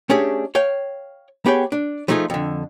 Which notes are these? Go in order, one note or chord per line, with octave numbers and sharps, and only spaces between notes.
A3 C#4 D4 G4 G#4
C#5 F5 G5
B3 G4 G#4 C#5 G5
D4
F3 A3 D#4 F4 G#4
F2 D3